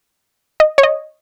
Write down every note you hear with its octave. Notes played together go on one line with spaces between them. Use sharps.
D#5
C#5
D#5